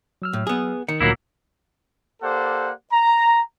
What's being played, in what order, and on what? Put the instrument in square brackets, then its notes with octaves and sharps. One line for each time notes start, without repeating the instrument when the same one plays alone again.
[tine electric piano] F#3 E6 F6
[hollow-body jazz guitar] A2
B3 G#4
[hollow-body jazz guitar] D#3 [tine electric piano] C#7
[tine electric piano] D2 A#2 [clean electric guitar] F#3 A#3 E4
[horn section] A#3 G4 A4 C5 D5 F#5
A#5